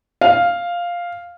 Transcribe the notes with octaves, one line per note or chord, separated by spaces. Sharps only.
F5